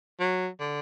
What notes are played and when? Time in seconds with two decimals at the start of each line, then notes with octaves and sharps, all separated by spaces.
0.20 F#3
0.60 D3